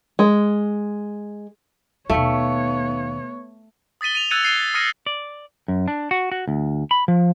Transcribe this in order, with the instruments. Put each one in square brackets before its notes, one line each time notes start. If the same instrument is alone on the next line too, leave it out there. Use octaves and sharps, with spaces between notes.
[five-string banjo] G#3
[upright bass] D#2 B2 [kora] A3 [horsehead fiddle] B3 C#5 [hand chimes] D#4 F5 C#7
[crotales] D#6 A6 B6 D#7 G7
D#7 F7
E6 F#6 G#6 A6 C#7 D#7
A6 C7 D#7 G7
A6
D#6 F6 G#6 A#6 C#7 D#7
[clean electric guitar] D5
F#2
D4
F#4
F#4
D2
B5
F3